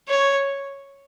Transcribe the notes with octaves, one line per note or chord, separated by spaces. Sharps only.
C#5